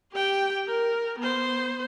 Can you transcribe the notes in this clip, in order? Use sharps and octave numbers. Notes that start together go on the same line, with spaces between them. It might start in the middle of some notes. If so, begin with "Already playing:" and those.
G4 G5
A#4
B3 C5